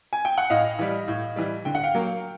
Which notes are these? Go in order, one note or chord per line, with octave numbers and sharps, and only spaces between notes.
G#5
G5
F#5
A2 D#5 F5
E3 G3
A2
E3 G3
D3 G5
F#5
F5 G5
F#3 A#3